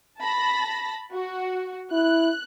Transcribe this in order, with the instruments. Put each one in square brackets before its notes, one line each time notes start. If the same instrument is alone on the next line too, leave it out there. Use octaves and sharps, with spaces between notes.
[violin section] A5 B5 A#6
F#4
[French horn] E4 [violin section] F#6